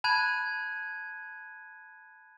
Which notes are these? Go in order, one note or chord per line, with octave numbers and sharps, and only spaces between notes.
A5 B5 F#6 G#6 D#7